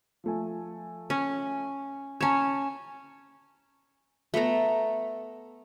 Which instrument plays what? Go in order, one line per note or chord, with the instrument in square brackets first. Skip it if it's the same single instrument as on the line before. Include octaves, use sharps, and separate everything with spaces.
[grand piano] F3 A3 G#5
[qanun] C#4
[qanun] C#4 C#5 [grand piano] A5 A#5 E7
[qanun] A3 B3 A4 A#5